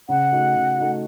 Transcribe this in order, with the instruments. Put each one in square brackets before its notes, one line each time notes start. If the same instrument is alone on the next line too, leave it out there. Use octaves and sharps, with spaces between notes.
[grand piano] C#3 [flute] F#5
[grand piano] A3 D#4 F#4
C#3
A3 D#4 F#4